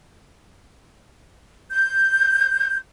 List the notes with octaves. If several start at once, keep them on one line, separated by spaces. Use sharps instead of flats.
G6